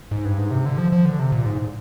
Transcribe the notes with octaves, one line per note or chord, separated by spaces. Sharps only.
G#2
G2
G#2
C3
D3
F3
F3
D3
C3
A#2
G#2